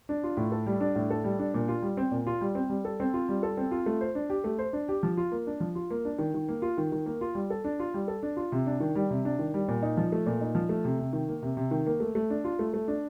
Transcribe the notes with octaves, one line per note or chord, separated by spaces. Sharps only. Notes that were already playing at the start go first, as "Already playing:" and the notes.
D4
F4
A2
A4
G3
D4
A2
A4
G3
D4
A#2
F4
G3
C4
A#2
F4
G3
C4
G3
A4
C4
F4
G3
A4
C4
F4
A3
C5
D4
G4
A3
C5
D4
G4
F3
F4
A#3
D4
F3
F4
A#3
D4
D#3
D#3
A#3
F4
D#3
D#3
A#3
F4
G3
A4
D4
F4
G3
A4
D4
F4
C3
D4
D#3
G3
C3
D4
D#3
G3
A#2
D#4
F3
A3
A#2
D#4
F3
A3
C3
C3
D#3
A#3
C3
C3
D#3
A#3
A3
A3
D4
F4
A3
A3
D4